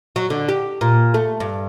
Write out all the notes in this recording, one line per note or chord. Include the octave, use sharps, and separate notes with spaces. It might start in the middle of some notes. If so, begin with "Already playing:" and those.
F#3
D3
G4
A#2
A3
G2